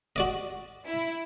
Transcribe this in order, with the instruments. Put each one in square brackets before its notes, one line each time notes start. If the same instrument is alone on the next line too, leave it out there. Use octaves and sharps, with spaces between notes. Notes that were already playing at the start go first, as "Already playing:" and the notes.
[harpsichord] F#4 D5 D#5
[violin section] E4